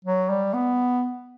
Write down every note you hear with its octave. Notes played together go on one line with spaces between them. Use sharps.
F#3
G3
B3